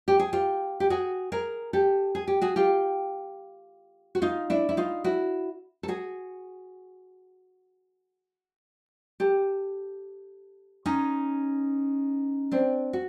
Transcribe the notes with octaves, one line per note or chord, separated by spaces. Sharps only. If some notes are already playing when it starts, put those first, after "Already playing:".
G4
G#4
F4 G4
G4
F#4 G#4
G#4 A#4
G4 A4
G#4
G4
F#4 G#4
F4 G4
F#4
D#4 F4
D4 E4
E4
D#4 F4
E4 F#4
A4
F#4 G#4
G4 A4
C#4 D#4
C4 D4
F#4